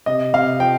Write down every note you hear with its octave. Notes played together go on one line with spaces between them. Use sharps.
C3 D#5
C3 F5
F3 G5